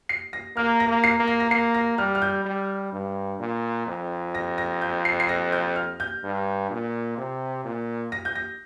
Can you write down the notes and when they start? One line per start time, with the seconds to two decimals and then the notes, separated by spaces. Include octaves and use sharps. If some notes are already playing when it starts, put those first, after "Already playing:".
0.09 C7
0.33 A#6
0.56 A#3 F6
0.80 A#6
0.88 A#3
1.04 C7
1.20 A#3
1.27 A#6
1.40 A#6
1.51 A#3 C7
1.74 A#6
1.98 G3 F6
2.15 F6
2.22 G6
2.45 G3
2.92 G2
3.40 A#2
3.87 F2
4.35 A#6
4.58 A#6
4.81 G6
5.05 C7
5.20 C7
5.29 A#6
5.52 G6
5.76 F6
6.00 G6
6.24 G2
6.71 A#2
7.18 C3
7.65 A#2
8.12 A#6
8.25 G6
8.35 A#6